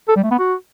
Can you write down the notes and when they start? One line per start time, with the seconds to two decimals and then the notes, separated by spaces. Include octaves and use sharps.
0.08 A4
0.16 G3
0.24 A3
0.31 B3
0.39 F#4